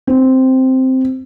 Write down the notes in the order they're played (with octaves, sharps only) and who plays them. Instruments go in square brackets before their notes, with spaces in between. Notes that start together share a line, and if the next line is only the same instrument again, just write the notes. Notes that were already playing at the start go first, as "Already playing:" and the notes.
[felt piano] C4